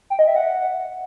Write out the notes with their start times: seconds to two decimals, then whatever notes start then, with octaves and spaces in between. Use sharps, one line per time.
0.10 G5
0.19 D#5
0.27 E5
0.36 F#5